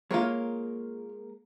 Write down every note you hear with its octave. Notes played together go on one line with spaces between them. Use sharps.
G#3 A#3 F4 A#4 C#5